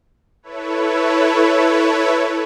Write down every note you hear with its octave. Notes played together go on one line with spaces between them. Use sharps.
E4 A4 B4 C#5